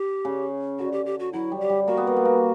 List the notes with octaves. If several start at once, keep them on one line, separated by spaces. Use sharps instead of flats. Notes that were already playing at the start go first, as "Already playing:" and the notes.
Already playing: G4
C#3
D3 F#4
G4
G4
F#4
F#3 E4
G3
G4
G3
A#3 F#4
B3
A#3
B3
A#3